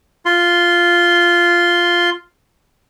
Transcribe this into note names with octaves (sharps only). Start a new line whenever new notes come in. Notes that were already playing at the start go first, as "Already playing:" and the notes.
F4 C6